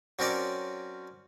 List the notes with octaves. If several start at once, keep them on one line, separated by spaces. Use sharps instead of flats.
F#3 C4 C#4 A#4 D5